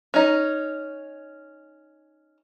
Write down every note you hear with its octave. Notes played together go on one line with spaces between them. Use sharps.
C#4 D#4